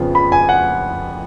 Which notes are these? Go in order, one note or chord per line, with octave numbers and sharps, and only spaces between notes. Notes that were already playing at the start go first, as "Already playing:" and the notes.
Already playing: F2 C#3 F3 B3 F4
B5
G#5
F#5